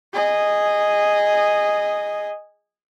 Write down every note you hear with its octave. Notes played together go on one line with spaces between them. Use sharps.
G#4 D#5